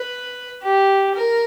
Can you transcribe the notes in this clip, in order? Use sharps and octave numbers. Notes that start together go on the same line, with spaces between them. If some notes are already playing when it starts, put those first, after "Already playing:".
Already playing: B4
G4
A#4